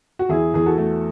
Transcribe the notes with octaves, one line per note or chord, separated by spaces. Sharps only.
F#4
E2 E4 G#4
E2 G#4
F#4 A4
A3